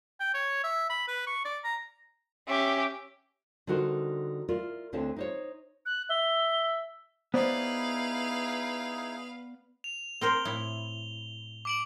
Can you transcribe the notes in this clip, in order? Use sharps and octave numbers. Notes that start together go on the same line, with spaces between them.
G5
C#5
E5
B5
B4
C#6
D5
A#5
C#4 G4 E5 D6
D3 G3 D#4 F#4 A#4 C5
E4 F4 A#4 D5
D2 D3 C4 E4 C#5 A5
D#4 C5 C#5
F#6
E5 G7
B3 D#4 E4 G#4 B4 C5 D5 F5
F7
C4 A#4 C5 G7
A2 E4
D6 D7 F#7